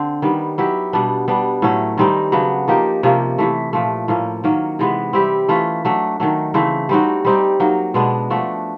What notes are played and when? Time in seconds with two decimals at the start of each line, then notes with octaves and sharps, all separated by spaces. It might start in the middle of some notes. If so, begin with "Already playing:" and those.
Already playing: D3 C4
0.22 D#3 G3 B3
0.58 F#3 B3 E4 G4
0.93 B2 G3 B3 D4
1.28 G3 B3 D4
1.62 A2 F#3 A3 C#4
1.98 D#3 G3 C4 D#4
2.32 C#3 F#3 B3 D4
2.68 F3 A#3 D#4 G4
3.03 C3 F3 A#3 C#4
3.38 C3 E3 A3
3.73 A#2 F3 A3
4.08 A2 F3 A#3 C#4
4.44 D#3 F#3 A#3 C#4
4.79 C3 E3 G#3 B3
5.13 G3 C4 E4 G4
5.49 E3 A3 C#4 F4
5.85 F#3 A3 D4
6.20 D#3 F#3 A3
6.54 C#3 E3 A3 C4
6.89 G3 C4 D#4 F#4
7.25 G3 C4 D#4 G4
7.60 F#3 A#3 D#4
7.94 B2 G#3 B3 D4
8.30 F3 A3 D4 F#4